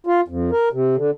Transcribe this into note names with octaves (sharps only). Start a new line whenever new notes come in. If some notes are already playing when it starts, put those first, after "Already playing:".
F4
F2
A#4
C3
D3